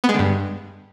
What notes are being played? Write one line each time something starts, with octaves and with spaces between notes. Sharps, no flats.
B3
G#3
D3
G2